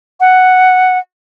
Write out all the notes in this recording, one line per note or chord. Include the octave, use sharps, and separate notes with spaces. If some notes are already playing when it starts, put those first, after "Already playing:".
F#5